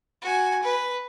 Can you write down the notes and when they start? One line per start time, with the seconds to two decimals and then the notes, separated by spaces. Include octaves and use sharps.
0.22 F#4 G#5
0.63 B4